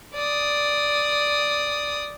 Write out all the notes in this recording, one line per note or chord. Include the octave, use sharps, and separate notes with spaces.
D5 D#6